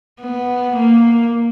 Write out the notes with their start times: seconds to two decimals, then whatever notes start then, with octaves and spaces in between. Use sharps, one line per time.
0.21 B3
0.76 A#3